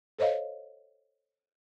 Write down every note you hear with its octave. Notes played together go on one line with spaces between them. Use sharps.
A4 C5 C#5 D#5 F5